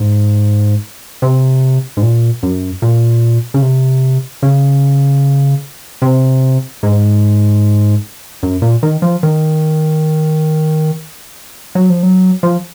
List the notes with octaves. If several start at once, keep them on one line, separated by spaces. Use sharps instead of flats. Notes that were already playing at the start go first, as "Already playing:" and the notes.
Already playing: G#2
C3
G#2
A#2
F#2
A#2
C#3
C3
C#3
C3
G#2
F#2
A#2
D#3
F3
D#3
F#3
F3
F#3
F3